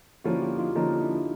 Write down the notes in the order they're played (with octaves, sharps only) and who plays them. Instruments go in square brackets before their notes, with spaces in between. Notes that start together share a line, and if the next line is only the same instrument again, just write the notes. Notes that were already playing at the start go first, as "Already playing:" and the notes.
[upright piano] D3 F3 A#3 C#4 [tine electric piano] E4 F#4
[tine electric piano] F4 G4
D#4 F4
[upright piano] D3 F3 A#3 C#4 [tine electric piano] D#4
[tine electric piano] D4 E4